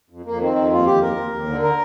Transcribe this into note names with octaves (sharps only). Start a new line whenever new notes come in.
F2
F2 A#3
D#3 C4
F2
D#2 F4
D#2 G4
D#2 A#4
D#2
D#2
D3
A#4